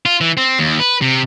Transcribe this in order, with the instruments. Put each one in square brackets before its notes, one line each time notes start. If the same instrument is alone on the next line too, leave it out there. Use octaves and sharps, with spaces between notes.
[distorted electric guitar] F4
E3
C4
D#2
B4
C3